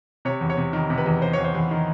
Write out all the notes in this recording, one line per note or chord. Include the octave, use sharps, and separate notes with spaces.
C3 C#5
E2
C#5
C3
D#3
C3
B4
E2
C3 C5
E2 C#5
C5
E2
D#3